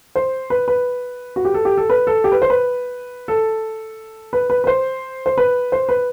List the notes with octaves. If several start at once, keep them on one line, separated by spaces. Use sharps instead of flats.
C5
B4
B4
F#4
G4
A4
G4
A4
B4
A4
G4
B4
C5
B4
A4
B4
B4
B4
C5
C5
B4
C5
B4